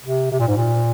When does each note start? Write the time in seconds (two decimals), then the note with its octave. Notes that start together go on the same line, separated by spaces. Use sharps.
0.04 C3
0.31 C3
0.40 A#2
0.47 G#2
0.56 A#2